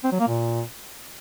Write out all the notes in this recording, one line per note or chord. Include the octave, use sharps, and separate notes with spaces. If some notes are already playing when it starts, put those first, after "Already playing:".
C4
F#3
A#3
A#2